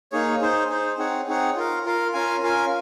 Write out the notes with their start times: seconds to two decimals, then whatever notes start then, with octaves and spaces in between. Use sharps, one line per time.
0.12 A#3 D#4 G#4 C#5
0.41 D#4 G#4 C5
0.70 D#4 G#4 C5
0.98 C4 D#4 G#4 C#5 F#5
1.27 C4 D#4 G#4 C#5 F#5
1.56 F4 A#4 F5
1.85 F4 A#4 F5
2.13 C#4 F4 A#4 F5 G#5
2.42 C#4 F4 A#4 F5 G#5